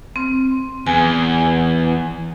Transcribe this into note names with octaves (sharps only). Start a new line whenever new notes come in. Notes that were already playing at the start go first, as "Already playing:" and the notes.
C4
E2 G#5